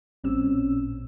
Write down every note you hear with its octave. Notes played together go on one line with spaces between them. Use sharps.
A1 A#2 G3 C4 C#4 E6